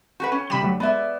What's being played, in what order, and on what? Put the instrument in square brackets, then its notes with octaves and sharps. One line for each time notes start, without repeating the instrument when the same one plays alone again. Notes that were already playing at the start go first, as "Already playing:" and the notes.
[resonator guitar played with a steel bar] F#4 G4 B4
C#4
[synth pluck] C3 B5 E7 [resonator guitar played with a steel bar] G3
[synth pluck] D2 F#3
[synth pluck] G#3 [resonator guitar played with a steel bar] B3 D5 E5